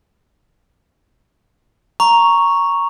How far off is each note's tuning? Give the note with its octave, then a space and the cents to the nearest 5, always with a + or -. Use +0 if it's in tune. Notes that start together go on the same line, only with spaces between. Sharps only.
A#5 +0 C#6 +0